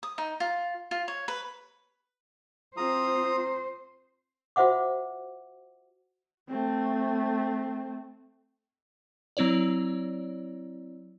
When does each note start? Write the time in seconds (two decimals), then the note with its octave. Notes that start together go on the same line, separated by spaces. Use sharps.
0.03 D#6
0.18 D#4
0.40 F4
0.91 F4
1.08 C#5
1.28 B4
2.77 C4 F4 C5 A#5 D#6
4.56 F4 F#4 C5 E5 F#5 D6
6.48 A3 C4
9.37 F#3 C4 E4 C#5 D5